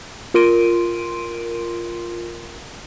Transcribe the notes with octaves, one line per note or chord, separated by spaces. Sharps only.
F4 A#4 C6 D7 D#7